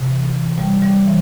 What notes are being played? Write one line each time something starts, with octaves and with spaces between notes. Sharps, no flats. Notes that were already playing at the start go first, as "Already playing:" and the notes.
Already playing: C3
E3
E3
G3
G3
E3